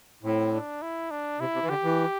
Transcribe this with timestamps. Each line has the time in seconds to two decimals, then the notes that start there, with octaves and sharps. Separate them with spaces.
0.23 A2 C4
0.53 D4
0.82 E4
1.11 D4
1.40 C3 E4
1.54 C3
1.63 E3
1.69 D3 G4
1.84 E3